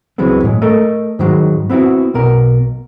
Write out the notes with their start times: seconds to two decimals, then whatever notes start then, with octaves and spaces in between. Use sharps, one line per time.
0.18 C#2 E3 F#3 G#3 B3 C4
0.44 A2 G#3
0.62 A3 A4 A#4 D#5
1.19 G#2 D#3 F#3 G#3
1.70 B3 C4 E4 F#4
2.14 B1 B2 A#4